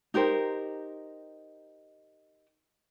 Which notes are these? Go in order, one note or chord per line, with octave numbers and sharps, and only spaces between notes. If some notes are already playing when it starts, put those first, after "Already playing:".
D#4 G4 A#4 C5